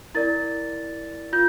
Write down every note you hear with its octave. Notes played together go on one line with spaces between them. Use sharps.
E4 A#4 D5 A6
F4 G6